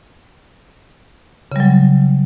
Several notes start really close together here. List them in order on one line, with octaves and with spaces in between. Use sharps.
C#3 G3 F#3